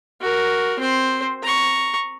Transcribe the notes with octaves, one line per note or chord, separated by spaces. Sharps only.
F#4 A#4
C4 C5
A#5 C#6